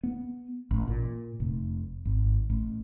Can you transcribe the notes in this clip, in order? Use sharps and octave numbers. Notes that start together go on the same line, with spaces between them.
B3
A1
A#2
F1
G#1
A1